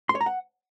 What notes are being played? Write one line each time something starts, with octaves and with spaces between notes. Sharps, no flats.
C6
C#5
A#5
F#5